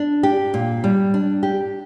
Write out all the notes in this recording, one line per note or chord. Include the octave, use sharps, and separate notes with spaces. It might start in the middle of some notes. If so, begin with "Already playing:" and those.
Already playing: D4
G4
A#2
G3
D4
G4